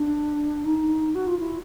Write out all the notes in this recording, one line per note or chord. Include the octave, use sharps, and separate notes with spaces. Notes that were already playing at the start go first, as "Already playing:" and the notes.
Already playing: D4
D#4
F#4
F4
E4